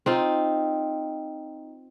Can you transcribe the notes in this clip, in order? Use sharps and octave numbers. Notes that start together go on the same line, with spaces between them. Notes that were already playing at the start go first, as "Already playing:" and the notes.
C4 D#4 F4